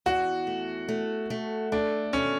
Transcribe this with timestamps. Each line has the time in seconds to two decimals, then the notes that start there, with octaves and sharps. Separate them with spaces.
0.06 E2 F#4
0.47 A3
0.89 A3
1.30 A3
1.72 A3 D4
2.13 B2 C#4